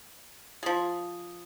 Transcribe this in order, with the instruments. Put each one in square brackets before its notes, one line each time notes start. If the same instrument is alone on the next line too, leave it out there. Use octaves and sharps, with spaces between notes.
[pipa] F3 G#4